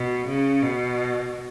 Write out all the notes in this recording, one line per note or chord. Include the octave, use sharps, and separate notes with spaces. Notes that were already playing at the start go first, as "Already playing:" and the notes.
Already playing: B2
C#3
B2